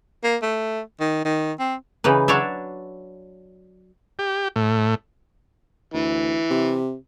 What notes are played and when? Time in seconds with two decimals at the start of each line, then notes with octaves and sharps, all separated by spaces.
0.24 A#3
0.42 A3
1.00 D#3
1.25 D#3
1.59 C4
2.04 C#3 E3 D#4 B4
2.28 F#3 D4 C#5 D5 E5
4.19 G4
4.56 A2
5.94 D2 E3
6.50 C3